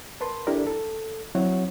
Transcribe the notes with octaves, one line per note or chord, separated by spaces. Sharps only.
A#4 B4 A5 C6
D4 E4 G4 A4 A#4 D5
A4
F#3 C4 E4 F#4 C#5 F#5